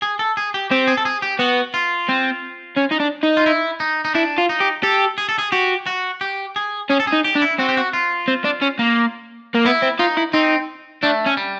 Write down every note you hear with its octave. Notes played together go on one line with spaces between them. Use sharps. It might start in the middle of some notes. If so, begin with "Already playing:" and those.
G#4
A4
G#4
G4
C4 G4
G#4
A4
G#4
G4
B3 F#4
F4
C4
C#4
D#4
D4
D#4
F4
E4
D#4
D#4
D4 E4
F4
D#4
G4
G4 A4
G#4
A4
G#4
F#4 G4
F#4
G4
G#4
C#4 G#4
A4
G#4
D#4
G4
D4
E4
C4 F#4
G4
F#4
F4
C4
D4
C#4
A#3
A#3
B3 E4
C4
D#4 F4
E4
C4 D#4
A3 D4
C#4
G3